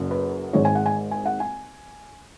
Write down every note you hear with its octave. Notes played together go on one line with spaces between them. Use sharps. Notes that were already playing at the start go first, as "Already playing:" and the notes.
Already playing: F#1 F#2 F#3
B4
G#1 G#2 G#3 C#5
G#5
F#5
G#5
G#5
F#5
G#5